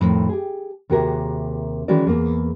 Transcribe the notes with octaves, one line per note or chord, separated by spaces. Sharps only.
F2 A2 D#3
G4 G#4
D#2 C3 F#4 G#4 A#4 E5
D#3 E3 G#3 C#4 F#4 D5
E2 A#3 G#4